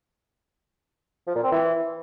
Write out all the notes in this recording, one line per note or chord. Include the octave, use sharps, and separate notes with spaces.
F3
A#2
C4
E3